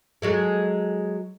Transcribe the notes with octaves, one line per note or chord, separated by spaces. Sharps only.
F#3 G#3 A4